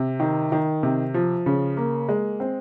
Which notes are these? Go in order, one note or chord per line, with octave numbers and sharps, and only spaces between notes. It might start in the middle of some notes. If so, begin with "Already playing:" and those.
Already playing: C3
D#3
D#3
C3
F3
C#3
A#3
G#3
C4